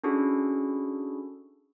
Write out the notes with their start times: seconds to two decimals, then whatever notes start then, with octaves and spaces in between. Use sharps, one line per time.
0.04 C#4 D4 E4 F#4 G#4 A4